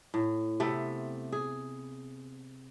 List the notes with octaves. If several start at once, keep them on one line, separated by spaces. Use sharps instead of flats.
A2
C3 A3 B3 C4
G#4